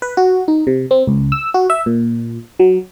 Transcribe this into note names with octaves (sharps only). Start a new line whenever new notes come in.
B4
F#4
D#4
C3
C4
C#2
E6
F#4
E5
A#2
F#3